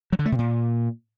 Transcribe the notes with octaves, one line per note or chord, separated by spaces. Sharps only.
F#3
D3
A3
C3
A#2